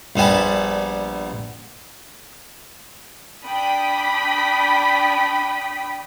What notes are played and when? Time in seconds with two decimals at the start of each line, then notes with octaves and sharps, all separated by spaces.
0.16 A#1 G3 B3 G#5 A5
3.45 D4 G5 B5 D#6 B6